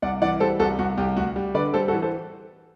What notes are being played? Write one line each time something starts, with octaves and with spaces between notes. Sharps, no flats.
C2 D5 F#5
E3 D5 F#5
G3 A4 C5
C2 F#4 A4
C2 F#4
C2 G4
D2 F#4
G3
D3 B4 D5
G3 A4 C5
F#4 A4
E3
A4 C5